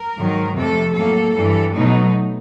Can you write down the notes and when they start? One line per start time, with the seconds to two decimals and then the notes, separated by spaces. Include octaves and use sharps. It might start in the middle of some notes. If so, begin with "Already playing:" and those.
Already playing: A#4
0.18 G#2 D#3 F#3
0.57 F2 C3 F3 A3 A4
0.95 A2 F#3 A#3 A4
1.35 G2 E3 G3
1.73 B2 F#3 A3 D#4